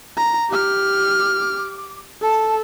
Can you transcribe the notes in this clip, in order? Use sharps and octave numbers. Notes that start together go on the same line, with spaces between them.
A#5
G4 D6 F6
A4 A5